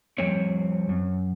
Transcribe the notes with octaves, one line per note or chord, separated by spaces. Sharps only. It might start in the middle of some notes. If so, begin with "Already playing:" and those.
F2 G3 C4 C#5
F#2